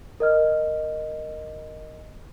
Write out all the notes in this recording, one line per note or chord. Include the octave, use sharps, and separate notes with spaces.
A#4 D#5 F6